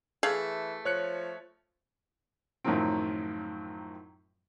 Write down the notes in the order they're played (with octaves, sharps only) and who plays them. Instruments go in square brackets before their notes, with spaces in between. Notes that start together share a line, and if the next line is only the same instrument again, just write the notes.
[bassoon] E3 [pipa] A3 G#4 F5
[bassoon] F3 [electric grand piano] C#5 F#6 C#7
[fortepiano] F#2 A2 D#3 F3 F#3 C4